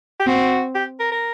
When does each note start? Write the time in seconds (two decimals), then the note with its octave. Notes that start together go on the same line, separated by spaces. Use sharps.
0.20 G4
0.27 C4 F#4
0.75 G4
1.00 A#4
1.12 A#4